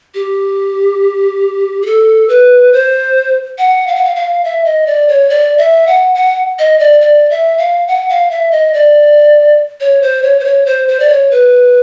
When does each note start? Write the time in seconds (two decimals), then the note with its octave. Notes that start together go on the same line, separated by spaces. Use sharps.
0.15 G4
1.82 G#4
1.86 A4
2.29 B4
2.73 C5
3.58 F#5
3.87 F5
3.96 F#5
4.04 F5
4.16 F5
4.44 E5
4.65 D#5
4.87 D5
5.08 C#5
5.30 D5
5.58 E5
5.87 F#5
6.15 F#5
6.59 D#5
6.79 D5
7.01 D5
7.30 E5
7.58 F5
7.88 F#5
8.09 F5
8.31 E5
8.51 D#5
8.74 D5
9.80 C#5
10.02 C5
10.23 C#5
10.40 C5
10.45 C#5
10.66 C5
10.88 C5
11.00 D5
11.09 C#5
11.31 B4